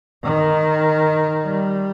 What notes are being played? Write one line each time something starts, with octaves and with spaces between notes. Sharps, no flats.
D#3
G3